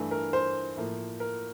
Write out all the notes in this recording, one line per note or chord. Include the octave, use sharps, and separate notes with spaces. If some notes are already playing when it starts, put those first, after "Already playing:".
Already playing: G2 E3 A3
A#4
C5
A2 F3 A#3
A#4